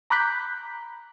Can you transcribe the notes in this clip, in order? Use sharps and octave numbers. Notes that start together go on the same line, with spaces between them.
A#5 B5 D6 F#6 G6 B6